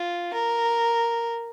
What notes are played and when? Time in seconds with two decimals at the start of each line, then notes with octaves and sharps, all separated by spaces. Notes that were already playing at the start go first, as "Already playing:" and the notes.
Already playing: F4
0.33 A#4